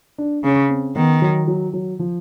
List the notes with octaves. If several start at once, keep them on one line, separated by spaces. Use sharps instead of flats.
D4
C#3 C#4
C4
D#3 B3
F#3
F#3
F#3
F3